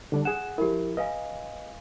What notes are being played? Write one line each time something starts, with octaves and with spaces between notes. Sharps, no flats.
D3 G3 D4
G#4 F#5 E7
F3 E4 G4 A#4
B4 D#5 F5 G#5